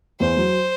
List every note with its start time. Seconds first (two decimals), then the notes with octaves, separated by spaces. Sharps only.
0.20 E2 C5
0.37 F#3